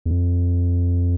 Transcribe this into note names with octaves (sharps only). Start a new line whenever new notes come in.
E2
F2